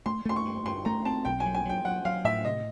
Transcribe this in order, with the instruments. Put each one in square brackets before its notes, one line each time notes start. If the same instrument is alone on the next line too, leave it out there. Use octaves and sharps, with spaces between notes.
[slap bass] A3 [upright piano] C6
[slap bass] A3 [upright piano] C6
[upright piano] C#6
[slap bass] G2
[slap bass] G2 [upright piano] C6
[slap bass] A3 [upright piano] A#5
[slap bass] C4 [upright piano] A5
[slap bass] B1 [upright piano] G5
[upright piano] G#5
[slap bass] F#3
[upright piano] G#5
[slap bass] F#3 [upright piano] G5
[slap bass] F#3 [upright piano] F#5
[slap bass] F#3 [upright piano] F5
[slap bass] A2 [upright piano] E5
[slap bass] C3 [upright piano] D#5